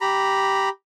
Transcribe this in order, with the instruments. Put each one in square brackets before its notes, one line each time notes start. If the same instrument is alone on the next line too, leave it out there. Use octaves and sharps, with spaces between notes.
[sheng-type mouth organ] G4 A#5 B5